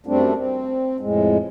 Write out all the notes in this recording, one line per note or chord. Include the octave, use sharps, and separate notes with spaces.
F#2 G3 A3 C4 D4
C4
F2 A2 G#3